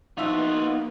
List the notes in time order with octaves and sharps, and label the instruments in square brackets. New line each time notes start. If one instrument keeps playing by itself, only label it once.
[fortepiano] F3 E5 [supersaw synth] A#3 B3 [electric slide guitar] D#4 [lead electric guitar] F4 F#4